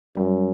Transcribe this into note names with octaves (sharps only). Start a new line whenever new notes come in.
F#2 G3